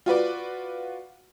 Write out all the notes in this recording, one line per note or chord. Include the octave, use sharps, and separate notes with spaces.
F4 F#4 B4 D5